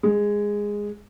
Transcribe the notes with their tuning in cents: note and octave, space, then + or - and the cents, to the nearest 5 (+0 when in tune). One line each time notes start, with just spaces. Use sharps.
G#3 -10